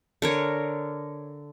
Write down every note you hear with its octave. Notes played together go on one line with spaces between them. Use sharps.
D3 A#4 C#5